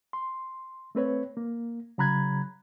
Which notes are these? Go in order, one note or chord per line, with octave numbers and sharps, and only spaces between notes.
C6
A3 C4 B4 C#5
A#3
C#3 F#3 A#5 B5 F#6 G#6